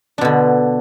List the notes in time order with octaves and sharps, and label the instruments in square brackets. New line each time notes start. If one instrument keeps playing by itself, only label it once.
[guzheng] D4
B2
D3